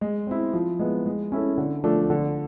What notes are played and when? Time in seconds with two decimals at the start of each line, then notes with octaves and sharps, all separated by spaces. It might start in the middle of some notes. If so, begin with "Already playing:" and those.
0.01 G#3
0.27 C4 E4
0.53 F3
0.79 G#3 B3 E4
1.06 G#3
1.32 C#4 E4 A4
1.58 D3
1.84 F3 A3 D4
2.10 D3